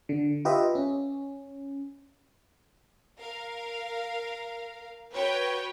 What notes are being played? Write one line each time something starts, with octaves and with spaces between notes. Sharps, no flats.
D3
F4 G4 B4 D#5 E5
C#4
A#4 F5
F#4 B4 C#5 G5